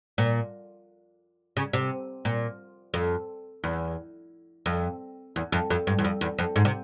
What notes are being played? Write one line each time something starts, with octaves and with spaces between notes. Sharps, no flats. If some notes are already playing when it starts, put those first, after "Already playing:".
A#2
C#3
C3
A#2
F2
E2
F2
E2
F2
F2
G2
E2
F2
E2
F2
G#2
C3